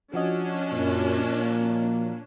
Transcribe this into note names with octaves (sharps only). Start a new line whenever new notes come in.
F3 C#4 D4 F#4 D#5
F#2 A#2
A#3